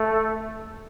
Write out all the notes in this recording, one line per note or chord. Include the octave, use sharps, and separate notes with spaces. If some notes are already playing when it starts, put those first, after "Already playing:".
Already playing: A3